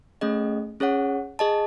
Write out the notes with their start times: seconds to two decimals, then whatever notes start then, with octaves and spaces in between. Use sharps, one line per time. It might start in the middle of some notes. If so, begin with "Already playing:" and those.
0.21 A3 C#4 G#4 D#5
0.80 C#4 G#4 C#5 F#5
1.39 G#4 D#5 A5